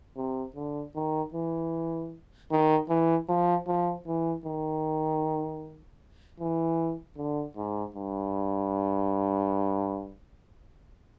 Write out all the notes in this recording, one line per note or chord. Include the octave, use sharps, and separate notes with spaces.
C3
D3
D#3
E3
D#3
E3
F3
F3
E3
D#3
E3
D3
G#2
G2